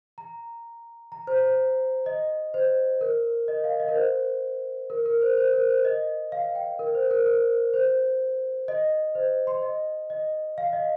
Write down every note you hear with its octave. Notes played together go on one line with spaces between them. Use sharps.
A#5
A#5
C5
C5
D#5
C5
A#4
D#5
F5
D#5
A#4
C5
A#4
A#4
C5
C5
A#4
C5
D#5
F5
G5
A#4
C5
A#4
A#4
C5
D#5
C5
C6
D#5
D#5
F5
D#5